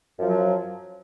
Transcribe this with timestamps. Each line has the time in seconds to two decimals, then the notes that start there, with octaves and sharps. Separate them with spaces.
0.18 F#2
0.21 F3
0.24 F#3